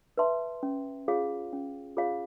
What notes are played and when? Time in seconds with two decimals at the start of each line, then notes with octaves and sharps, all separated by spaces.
0.17 B4 E5 A5 C6
0.63 C#4
1.08 F4 G#4 C#5 F5
1.53 C#4
1.97 F4 G#4 C#5 F5